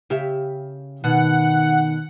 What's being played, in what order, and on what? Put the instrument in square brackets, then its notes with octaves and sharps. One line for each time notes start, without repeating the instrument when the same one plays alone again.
[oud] C#3 G4 E5
[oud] B2 [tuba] D#3 [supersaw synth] F#5